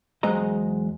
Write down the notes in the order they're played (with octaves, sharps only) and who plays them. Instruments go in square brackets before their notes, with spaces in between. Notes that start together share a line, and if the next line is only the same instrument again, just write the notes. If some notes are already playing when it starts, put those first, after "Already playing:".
[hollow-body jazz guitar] E2 F#3 G#3 C5 D#5 A#5